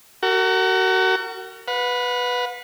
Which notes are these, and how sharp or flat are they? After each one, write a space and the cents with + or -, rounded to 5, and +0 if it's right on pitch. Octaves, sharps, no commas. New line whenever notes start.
F#4 +30 A#4 -30
B4 +0 F#5 -40